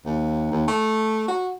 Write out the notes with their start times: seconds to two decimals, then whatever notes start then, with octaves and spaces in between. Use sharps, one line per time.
0.05 D#2
0.51 D#2
0.68 A3
1.28 F#4